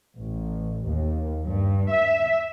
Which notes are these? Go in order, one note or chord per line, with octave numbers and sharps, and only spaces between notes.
A1
D#2
G2
E5